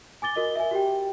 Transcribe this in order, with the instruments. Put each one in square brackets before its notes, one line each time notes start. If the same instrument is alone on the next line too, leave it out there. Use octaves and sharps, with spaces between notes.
[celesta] G#5 D6 A6 G7
F#4 A#4 D#5 G7
E5 G#5
F#4 G4 G5